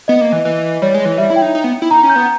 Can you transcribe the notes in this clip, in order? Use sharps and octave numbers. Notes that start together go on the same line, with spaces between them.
B3 D#5
A#3
E3
E3
G3 C#5
G#3
E3
G3 E5
E4
G5
D#4
D#4
B3
E4
D#4 A#5
C#4
G6
B3